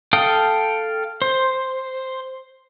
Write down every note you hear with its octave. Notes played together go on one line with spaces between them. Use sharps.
A4 F5 G5 D#6
C5